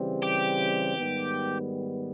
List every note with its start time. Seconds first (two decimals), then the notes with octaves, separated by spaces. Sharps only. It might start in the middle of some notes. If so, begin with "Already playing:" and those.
Already playing: C#3 E3 G3 C4
0.22 G4
0.96 G#2 D#3 G3 B3